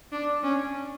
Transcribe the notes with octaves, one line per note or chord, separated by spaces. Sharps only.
D4
C#4